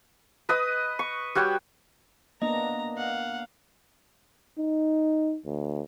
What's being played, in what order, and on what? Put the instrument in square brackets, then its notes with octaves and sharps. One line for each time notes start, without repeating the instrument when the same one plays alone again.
[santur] B4 D#5 D#6
C#6
G3 F#4 C#5 G5
[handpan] A#3 B3 D4 [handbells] D#5 [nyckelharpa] A#5
[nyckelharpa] F5 [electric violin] F#5
[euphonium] D#4
D2